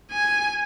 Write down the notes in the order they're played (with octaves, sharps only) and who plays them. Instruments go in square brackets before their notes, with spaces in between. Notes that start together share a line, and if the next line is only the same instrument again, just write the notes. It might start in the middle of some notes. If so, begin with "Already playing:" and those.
[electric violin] G#5